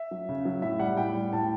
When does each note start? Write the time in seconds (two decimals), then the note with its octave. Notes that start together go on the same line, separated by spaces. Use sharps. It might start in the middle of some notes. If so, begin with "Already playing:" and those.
Already playing: E5
0.11 F#3
0.29 C#3
0.45 F#3
0.62 A2 E5
0.79 G3 F#5
0.97 A2 G5
1.15 G3
1.33 A2 A5